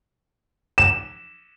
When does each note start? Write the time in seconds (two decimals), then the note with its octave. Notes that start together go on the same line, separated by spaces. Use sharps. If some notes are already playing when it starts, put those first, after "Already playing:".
0.78 E7